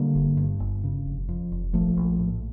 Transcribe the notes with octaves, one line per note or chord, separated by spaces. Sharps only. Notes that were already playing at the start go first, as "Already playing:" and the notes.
Already playing: D3 G3 A#3
G1
G2
G1
C#3
F1
F2
F1
A#1 F3 A3
A#1
A2